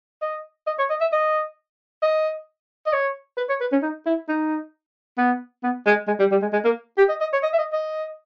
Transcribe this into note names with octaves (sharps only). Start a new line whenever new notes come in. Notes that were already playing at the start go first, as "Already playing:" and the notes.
D#5
D#5
C#5
D#5
E5
D#5
D#5
D#5
C#5
B4
C#5
B4
C#4
D#4
E4
D#4
B3
B3
G#3
G#3
G3
G3
G#3
G#3
A#3
G4
D#5
D#5
C#5
D#5
E5
D#5
D#5